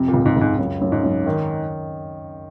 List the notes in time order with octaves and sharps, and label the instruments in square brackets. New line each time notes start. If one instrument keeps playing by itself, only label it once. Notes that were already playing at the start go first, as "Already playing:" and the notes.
Already playing: [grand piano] F2 C3
[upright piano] A#2
[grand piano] C#2
[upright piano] G#2
[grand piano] C#2 [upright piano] G#2
[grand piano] F#2
F#2
[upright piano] G#2
[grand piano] F#2
D#3